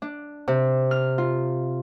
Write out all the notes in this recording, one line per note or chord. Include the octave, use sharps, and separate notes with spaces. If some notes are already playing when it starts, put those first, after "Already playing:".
D4
C3
F6
F4